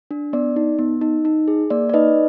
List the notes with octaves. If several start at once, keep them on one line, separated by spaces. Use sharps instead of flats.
D4
B3 D5
D#4
B3
D#4
D#4
G#4
A#3 D5
D5
D#4 B4 D#5